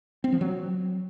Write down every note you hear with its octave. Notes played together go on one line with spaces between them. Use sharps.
C4
F3
F#3